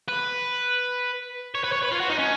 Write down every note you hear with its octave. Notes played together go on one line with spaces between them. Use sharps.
B4
C#5
B4
C#5
B4
F4
F#4
D#4
C#4